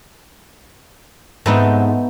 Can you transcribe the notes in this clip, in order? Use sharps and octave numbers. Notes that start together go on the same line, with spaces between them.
G#2 A3 B3 C4 D#4